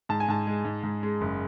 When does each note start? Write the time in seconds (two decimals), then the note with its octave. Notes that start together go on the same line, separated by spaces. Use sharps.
0.09 G#2 A5
0.20 G#5
0.28 G#2 A5
0.47 G#3
0.65 G#2
0.83 G#2
1.03 G#3
1.21 F#1